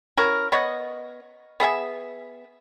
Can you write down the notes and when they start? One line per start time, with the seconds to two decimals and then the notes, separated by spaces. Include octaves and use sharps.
0.17 C#4 E4 F#4 A#4
0.52 B3 C#5 D#5 F#5
1.60 B3 G#4 E5 G#5